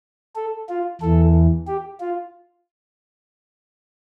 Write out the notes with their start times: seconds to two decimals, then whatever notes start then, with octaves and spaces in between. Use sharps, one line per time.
0.35 A4
0.69 F4
1.01 E2 E3 A4
1.67 G4
2.00 F4